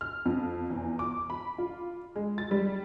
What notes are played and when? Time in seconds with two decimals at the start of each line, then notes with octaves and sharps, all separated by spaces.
0.01 F6
0.25 F2
0.70 E2
0.99 D6
1.30 B5
1.58 F4
2.16 G#3
2.38 A6
2.51 G3